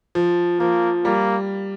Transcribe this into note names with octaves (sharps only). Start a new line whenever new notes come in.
F3
F3 A#3
G3 A#3